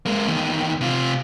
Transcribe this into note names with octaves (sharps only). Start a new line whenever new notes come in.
G#3 A#3
E2 D#3
C3 F4